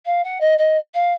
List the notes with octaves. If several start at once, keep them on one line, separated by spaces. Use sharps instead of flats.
F5
F#5
D#5
D#5
F5